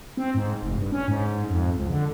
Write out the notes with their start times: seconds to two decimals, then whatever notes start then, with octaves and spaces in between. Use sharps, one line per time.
0.17 C4
0.35 G#2
0.63 F1
0.78 G2
0.92 C#4
1.08 G#2
1.51 F2
1.76 C#2
1.90 D3